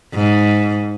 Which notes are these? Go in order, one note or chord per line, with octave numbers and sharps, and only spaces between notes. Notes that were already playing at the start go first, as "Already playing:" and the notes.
G#2